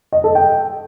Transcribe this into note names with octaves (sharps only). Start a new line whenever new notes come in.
D#5
A4
G5